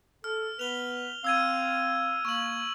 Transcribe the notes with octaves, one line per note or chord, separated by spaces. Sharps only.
A4 F6
B3 B4 F7 G7
C4 F5 E6 G#6 D#7
A#3 C#6 F#7